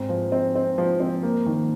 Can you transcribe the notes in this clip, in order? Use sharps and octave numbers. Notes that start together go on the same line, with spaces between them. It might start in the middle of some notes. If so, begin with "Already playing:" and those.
Already playing: G#2 C4
F3
C4
C4
F3
C4
A#3
D#3